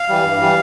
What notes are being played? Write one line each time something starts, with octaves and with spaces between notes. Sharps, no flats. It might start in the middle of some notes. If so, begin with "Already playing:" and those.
Already playing: F5
E3 G3
G2
E3 G3